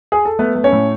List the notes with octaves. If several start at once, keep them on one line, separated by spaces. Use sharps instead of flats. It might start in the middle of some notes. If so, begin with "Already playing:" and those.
G#4
A4
A3 B3 B4
A3
C#4 C#5
A2